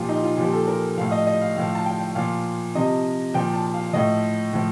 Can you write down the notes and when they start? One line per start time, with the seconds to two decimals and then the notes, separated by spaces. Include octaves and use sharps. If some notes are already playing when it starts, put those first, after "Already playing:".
Already playing: A#2 F3 F4 G4
0.09 D#4
0.24 F4
0.38 A#2 F3 G4
0.53 A4
0.67 A#4
0.97 F3 F5
1.01 A2
1.07 F5
1.12 D#5
1.27 D#5
1.41 F5
1.56 A2 F3 F5
1.75 A5
1.86 G5
2.15 A#2 F3 F5
2.75 C3 F3 D#5
3.34 A#2 F3 G5
3.54 A5
3.74 F5
3.93 A2 F3 D#5
4.53 A2 F3